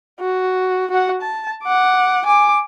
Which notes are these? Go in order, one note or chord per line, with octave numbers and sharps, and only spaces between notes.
F#4
F#4 F#5
A5
F#5 D6
G#5 D6